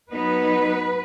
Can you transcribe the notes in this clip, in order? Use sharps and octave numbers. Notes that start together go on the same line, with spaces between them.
F#3 B3 D#4 B4